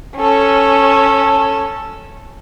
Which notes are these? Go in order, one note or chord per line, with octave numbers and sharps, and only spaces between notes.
C#4 A4